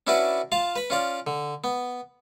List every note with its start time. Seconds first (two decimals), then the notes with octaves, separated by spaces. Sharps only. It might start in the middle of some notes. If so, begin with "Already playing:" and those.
0.07 C#4 D4 E4 F#4 B4 D5
0.52 F4 F5 A5
0.76 B4 B5
0.90 C#4 F4 D5
1.27 D3
1.64 B3